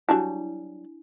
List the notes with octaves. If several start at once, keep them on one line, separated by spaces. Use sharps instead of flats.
F#3 G3 D4 E4 A5